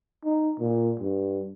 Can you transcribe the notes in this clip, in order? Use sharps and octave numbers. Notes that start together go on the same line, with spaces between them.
D#4
A#2
G2